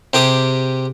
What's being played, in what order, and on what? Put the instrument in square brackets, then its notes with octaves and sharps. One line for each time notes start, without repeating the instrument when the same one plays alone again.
[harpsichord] C3 G4 G#4